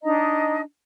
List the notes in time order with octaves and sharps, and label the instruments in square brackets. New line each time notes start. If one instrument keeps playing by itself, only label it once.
[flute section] D4 D#4 D#5 A#5